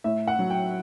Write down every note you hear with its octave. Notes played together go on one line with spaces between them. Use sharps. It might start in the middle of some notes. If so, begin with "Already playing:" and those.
A2 E5
F#5
F#3
G5